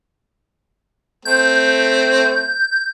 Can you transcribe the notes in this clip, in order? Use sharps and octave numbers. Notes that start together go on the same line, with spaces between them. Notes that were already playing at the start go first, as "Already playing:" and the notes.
A3 C4 G6